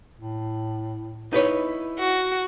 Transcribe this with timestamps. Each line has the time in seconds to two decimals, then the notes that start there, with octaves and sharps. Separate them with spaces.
0.20 A2
1.33 D#4 E4 B4 C#5
1.99 F#4